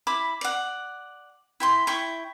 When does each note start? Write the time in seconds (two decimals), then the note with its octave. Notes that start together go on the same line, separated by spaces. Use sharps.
0.07 E4 B5 D6
0.41 D5 F#5
1.60 E4 G5 C6
1.87 E4 G5 C#6